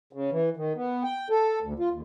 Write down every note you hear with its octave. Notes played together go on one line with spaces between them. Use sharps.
C#3
E3
D#3
B3
G5
A4
D2
F4
D#2